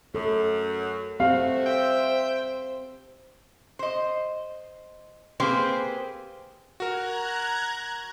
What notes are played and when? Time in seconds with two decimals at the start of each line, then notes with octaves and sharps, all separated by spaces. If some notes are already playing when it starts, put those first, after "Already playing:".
0.15 F#2 A4
1.20 A3 C4 F#4 G4 C5 F5
1.66 E5 G5
3.79 C5 D#5
5.40 A#3 C4 G4 G#4 B4 C5
6.80 F#4 A#4 A#5 F#6 G#6